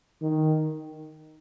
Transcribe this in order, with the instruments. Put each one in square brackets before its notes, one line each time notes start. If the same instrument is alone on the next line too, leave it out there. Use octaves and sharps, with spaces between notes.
[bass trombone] D#3